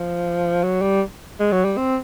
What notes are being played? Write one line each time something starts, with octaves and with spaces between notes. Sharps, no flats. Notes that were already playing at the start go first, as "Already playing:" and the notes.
Already playing: F3
F#3
G3
G#3
F#3
G3
C4